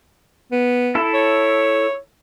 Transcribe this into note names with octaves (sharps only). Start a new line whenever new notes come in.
B3
E4 A4
C#5